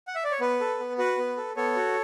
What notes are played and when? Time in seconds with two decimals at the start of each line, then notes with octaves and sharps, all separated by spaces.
0.07 F#5
0.15 E5
0.24 D5
0.32 C#5
0.40 B3 B4
0.60 A4
0.80 B3
0.98 F#4 B4
1.18 B3
1.37 A4
1.56 B3 A4 C#5
1.76 F#4